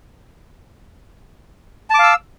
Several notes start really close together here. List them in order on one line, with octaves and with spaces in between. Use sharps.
A5 D6 F5 E6